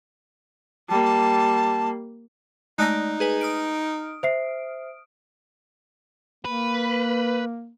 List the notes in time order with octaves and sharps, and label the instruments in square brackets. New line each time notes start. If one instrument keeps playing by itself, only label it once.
[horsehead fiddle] G3 A#3 [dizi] A5
[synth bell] G#3 A3 D5 [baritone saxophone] D#4 [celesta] F#6 A#6
[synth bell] G#4 B4 G#5
D#6 F6 D7
[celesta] C5 E5 C7
[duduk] A#3 [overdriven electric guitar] B4